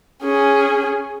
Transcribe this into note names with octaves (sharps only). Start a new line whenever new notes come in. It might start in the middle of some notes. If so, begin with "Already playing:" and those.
C#4 G#4